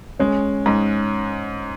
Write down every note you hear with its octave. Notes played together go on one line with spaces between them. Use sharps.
G#3 C#4
G#2